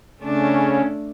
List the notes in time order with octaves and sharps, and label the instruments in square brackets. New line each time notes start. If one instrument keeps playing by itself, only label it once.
[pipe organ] C#3 C#4 [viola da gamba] A3 D4